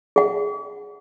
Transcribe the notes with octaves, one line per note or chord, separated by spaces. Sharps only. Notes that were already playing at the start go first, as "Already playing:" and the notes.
G#4 F#5